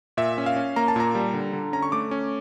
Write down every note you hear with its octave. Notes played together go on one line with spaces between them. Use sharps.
A#2 E5
C#4
F5
C#4
A#3 A#5
A5
A#2 A#5
G3
D3
D3
C#4 A#5
C#6
A3 D6
C#4